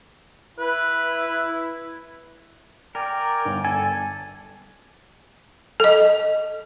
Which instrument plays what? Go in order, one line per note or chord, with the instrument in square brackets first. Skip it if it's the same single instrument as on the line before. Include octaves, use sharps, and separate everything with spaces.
[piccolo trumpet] E4 [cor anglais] B4
[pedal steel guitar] A#4 [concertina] D5 G5 G#5
[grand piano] G1
[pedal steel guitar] A4 [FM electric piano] G#5
[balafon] A4 D#5